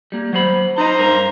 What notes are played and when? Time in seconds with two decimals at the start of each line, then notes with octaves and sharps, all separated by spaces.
0.12 G3 A#3
0.33 F#3 C5 B5
0.78 D#4 C5 D#5 A#5
0.99 G2 A#4